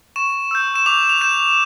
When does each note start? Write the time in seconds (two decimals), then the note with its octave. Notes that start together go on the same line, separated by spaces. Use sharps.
0.16 C#6 E7
0.51 E6 G6
0.76 E7
0.86 D6 F7
1.09 F7
1.21 G6 E7